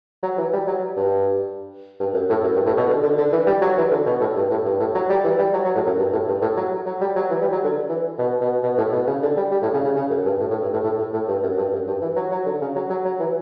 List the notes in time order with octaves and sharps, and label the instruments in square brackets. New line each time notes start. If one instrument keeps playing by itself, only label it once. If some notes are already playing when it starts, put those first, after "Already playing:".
[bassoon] F#3
E3
G3
F#3
G2
G2
F#2
A2
F#2
G2
A2
B2
D3
D3
D3
E3
G3
F#3
E3
D3
B2
A2
G2
A2
G2
A2
F#3
G3
E3
G3
F#3
F#3
A2
F#2
G2
A2
G2
A2
F#3
F#3
G3
F#3
E3
G3
F#3
D3
E3
B2
B2
B2
A2
B2
C#3
D3
G3
G3
A2
C#3
C#3
C#3
F#2
G2
A2
A2
G2
A2
A2
A2
A2
G2
F#2
G2
F#2
G2
E3
F#3
F#3
D3
C#3
F#3
F#3
F#3
E3